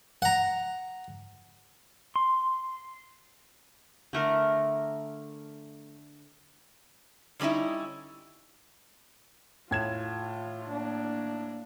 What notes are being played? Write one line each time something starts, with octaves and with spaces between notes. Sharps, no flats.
F#5 A#5
C6
D3 A3 A#4
D3 G3 C#4 D#4 E4
A2 F4 G#6 E7
A#3 D4